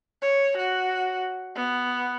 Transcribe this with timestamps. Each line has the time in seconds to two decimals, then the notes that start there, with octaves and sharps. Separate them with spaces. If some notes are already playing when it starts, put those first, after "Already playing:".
0.22 C#5
0.57 F#4
1.55 B3